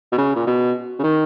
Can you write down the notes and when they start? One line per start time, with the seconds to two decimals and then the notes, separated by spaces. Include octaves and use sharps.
0.12 B2
0.18 C#3
0.35 A#2
0.47 B2
0.99 C#3
1.03 D#3